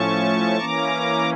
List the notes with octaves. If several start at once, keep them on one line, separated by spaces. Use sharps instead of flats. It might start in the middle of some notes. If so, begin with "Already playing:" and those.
Already playing: A2 F3 A3 C#4 A5 C#6
E3 A#3 C#4 A#5 D6